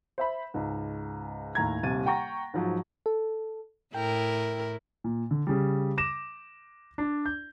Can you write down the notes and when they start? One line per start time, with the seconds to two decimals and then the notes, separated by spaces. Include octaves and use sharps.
0.18 C5 E5 B5
0.54 C#2 G#2
1.55 D#2 A2 A#5 G#6
1.83 D#1 C3 A6 D#7
2.06 F#5 G5 A#5 C#6 A#6
2.54 G#2 F3 F#3
3.06 A4
3.94 A2 E4 A#4 G5
5.04 A#2
5.31 D3
5.47 C#3 G3
5.98 D6 A#6 E7
6.98 D4 D5
7.26 G6